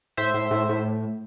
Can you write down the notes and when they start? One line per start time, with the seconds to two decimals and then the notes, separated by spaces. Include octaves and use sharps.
0.17 A2 C5 E5
0.34 A2
0.51 A2
0.69 A2